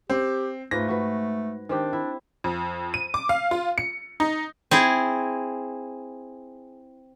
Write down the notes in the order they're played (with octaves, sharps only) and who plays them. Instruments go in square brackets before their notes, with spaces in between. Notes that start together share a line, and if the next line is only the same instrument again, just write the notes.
[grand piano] C4 [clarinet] G4
[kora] G#2 F4 B4 [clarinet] A3 [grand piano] A#6
[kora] F#4 B4
[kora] D#3 C4 G4 [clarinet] D4
[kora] E4
[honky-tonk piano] F2
D#7
D6
F5
F4
C#7
D#4
[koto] C4 E4 G#4